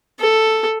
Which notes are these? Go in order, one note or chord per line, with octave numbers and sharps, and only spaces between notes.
A4